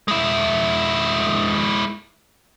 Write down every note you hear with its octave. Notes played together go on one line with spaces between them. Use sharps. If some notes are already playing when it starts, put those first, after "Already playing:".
G#3 E4